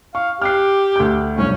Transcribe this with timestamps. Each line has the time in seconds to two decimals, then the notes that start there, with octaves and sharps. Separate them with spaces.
0.15 F5 C#6
0.42 G4 F6 F#6 C7
0.96 D2 G6
1.38 F1 B1 G2 C#4